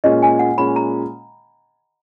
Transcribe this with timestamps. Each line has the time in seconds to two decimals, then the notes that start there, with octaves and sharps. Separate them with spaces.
0.04 A#2 G#3 C#4 D#5
0.23 G#5
0.39 F#5
0.58 A#2 G#3 C#4 B5
0.76 A#5